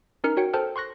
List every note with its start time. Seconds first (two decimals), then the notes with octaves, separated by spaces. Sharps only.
0.24 C#4 D#4 A#4 F6 C#7
0.37 F#4 C#5 G5 C#7
0.53 A4 C5 G5 A5 F6
0.76 C6 C#6 F#6 A#6